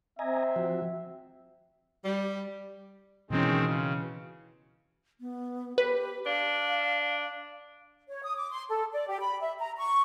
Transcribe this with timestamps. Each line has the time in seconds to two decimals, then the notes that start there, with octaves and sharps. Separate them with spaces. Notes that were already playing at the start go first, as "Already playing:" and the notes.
0.19 C4 D#5 E5 G#5 A#5
0.56 F3 F#4
2.05 G3
3.30 B2 D#3 E3 G#3 C4 C#4
3.66 C#3
5.21 B3
5.78 G4 B4
6.26 D4 F5
8.09 C#5
8.23 D#6
8.36 D6
8.51 C6
8.69 A4
8.92 D5
9.08 G4
9.20 B5
9.41 E5
9.59 A#5
9.77 C#6